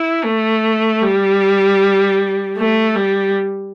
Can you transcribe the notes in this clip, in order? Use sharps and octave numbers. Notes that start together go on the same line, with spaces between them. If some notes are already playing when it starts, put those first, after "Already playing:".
Already playing: E4
A3
G3
A3
G3